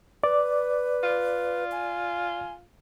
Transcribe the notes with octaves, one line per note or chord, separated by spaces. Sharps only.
B4 D5
F4
G#5